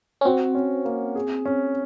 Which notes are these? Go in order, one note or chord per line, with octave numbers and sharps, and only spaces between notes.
C#4
C4 F#4
C#4
A#3
G#4
C#4